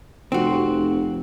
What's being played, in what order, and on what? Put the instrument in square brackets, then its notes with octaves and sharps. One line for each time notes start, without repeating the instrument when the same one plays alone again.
[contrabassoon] F1 [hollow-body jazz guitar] C4 F#4